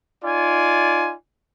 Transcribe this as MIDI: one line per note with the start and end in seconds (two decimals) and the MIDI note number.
0.24 1.13 63
0.24 1.13 65
0.24 1.13 74
0.24 1.13 80